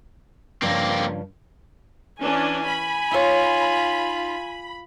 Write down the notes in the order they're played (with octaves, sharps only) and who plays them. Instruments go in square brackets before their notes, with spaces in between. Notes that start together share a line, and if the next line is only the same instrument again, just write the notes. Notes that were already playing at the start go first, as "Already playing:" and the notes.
[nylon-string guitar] G2 C#3 F3 [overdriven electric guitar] A#3 C4
[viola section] E3 C#4 D4 [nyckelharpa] G#5
[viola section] B5
[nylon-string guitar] D#4 C#5 [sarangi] F4